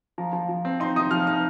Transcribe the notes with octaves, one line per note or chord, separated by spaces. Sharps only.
F3 A#5
F3
F3
C4
D#4 C6
D#4 D#6
F3 F6
D#4 F6